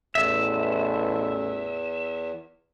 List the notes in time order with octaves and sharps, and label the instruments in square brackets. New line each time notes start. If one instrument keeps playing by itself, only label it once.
[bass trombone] A1 [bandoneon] E2 [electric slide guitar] E5